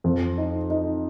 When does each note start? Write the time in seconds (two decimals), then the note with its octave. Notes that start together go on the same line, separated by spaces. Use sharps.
0.04 F2
0.38 D#4
0.70 D#4